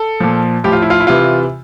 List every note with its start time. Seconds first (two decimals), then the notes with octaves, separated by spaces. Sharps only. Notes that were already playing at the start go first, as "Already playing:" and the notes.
Already playing: A4
0.20 A#2 F3
0.64 A2 F3 G4
0.73 F4
0.82 E4
0.90 F4
1.00 E4
1.07 C3 E3 F4